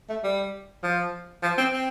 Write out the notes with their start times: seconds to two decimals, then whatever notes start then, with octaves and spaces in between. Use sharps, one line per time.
0.09 A3
0.24 G3
0.83 F3
1.43 F3
1.58 C4
1.73 C4